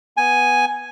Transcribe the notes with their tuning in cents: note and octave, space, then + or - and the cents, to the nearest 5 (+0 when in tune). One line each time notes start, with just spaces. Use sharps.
B3 +0 G#5 +0